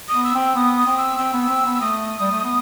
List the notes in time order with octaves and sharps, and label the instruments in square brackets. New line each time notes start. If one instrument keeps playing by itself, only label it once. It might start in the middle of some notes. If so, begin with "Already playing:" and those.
[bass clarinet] B3 [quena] D#6
[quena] E6
[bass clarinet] C4 [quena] E6
[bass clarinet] B3 [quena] D#6
[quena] D#6
[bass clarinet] C4
[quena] E6
[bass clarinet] C4 [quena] E6
[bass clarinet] B3
C4
B3
[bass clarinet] A3 [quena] D#6
[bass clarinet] G3
A3
B3